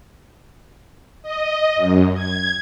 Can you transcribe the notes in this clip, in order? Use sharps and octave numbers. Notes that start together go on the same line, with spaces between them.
D#5
F#2
G#6